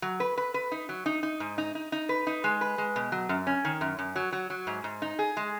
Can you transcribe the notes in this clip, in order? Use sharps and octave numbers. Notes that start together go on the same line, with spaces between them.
F#3
B4
B4
B4
D#4
F#3
D#4
D#4
G#2
D#4
D#4
D#4
B4
D#4
G#3
B4
G#3
B2
F#3
F#2
C#4
D#3
F#2
F#2
F#3
F#3
F#3
G#2
G#2
D#4
G#4
G#3